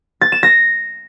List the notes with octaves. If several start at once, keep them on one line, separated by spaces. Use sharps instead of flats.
A6
E7
A#6